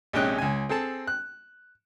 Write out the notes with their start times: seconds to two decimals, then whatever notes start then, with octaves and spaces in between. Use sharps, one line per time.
0.13 A#1 C3 G#3 C#4 G5 F#6
0.38 C#2 G#5
0.69 C4 G#4 A4 A5
1.07 F#6